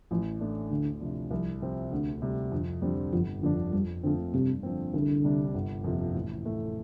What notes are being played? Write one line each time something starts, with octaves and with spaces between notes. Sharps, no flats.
A1 F3
A2 A3 D4
D2 D3
C3 F3 D4
C2 F3
C3 F3 C4
D2 D3
C3 G3
F2 D3
D3 F3 G3 C4
G1 F3
F2 D3 F3 D4
F2 G3
D3 F3 A3 C4
G2 C3
D3 F3 C4
C2 D3
C3 G3 D4
G1
F2 C3 F3
A1
A2 A3